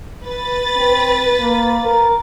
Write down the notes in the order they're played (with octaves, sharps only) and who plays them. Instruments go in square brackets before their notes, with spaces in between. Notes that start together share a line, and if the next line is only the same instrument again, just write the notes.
[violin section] B4 A6
[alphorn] C4
A#3
A#4